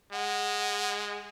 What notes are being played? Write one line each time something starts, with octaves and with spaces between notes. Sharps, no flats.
G#3 F#5